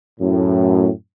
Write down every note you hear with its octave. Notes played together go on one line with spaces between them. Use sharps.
F#2 A2